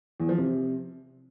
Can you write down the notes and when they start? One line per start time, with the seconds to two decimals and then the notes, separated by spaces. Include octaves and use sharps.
0.20 E2
0.29 F3
0.38 C3